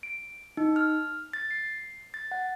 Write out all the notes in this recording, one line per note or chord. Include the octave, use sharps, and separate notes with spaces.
D7
D#4
F6
A6
C7
A6
F#5